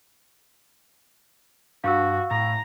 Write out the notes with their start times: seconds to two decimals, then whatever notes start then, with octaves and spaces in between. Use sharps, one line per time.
1.84 G2 F#4 F5 C#6 E6
2.31 A2 A#5